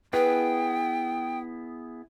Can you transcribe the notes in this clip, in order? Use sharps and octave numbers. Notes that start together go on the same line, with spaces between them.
B3 E4 G#4 B4 G5